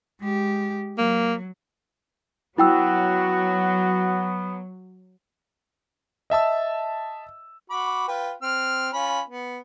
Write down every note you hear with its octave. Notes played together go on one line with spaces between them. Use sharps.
G#3 G4
F#3 A#3
F#3 B3 E4 F#4 G5 E6
D#5 E5 A5 E6
F#4 B5 D6
F4 B4 G5
C4 F6
C#4 F4 B5
B3